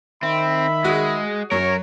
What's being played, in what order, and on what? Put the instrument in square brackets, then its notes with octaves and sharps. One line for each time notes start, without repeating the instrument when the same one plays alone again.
[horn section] D#3 E5 B5 [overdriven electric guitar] C4
[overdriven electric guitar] G#3 [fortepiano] F#4 G#4
[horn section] F#2 C#5 [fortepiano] F#3 [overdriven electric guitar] A#4